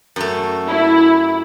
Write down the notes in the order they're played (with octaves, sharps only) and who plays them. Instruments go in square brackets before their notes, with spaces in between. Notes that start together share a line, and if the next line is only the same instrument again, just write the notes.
[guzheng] F#2 A3
[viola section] E4